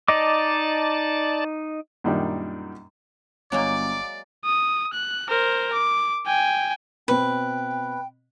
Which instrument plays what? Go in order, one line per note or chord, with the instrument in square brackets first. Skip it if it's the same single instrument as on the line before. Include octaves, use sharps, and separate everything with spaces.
[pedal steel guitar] D#4 D#5 D6 [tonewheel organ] D5 A5
[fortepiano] F#2 A#2 D#3 G3 D4
[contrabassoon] G1 [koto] F#3 G#3 A#3 [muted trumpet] D5 [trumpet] D6
[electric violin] D#6
F#6
A#4 C5
D6
G5 G#5
[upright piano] B2 C4 [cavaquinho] B4 [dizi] G5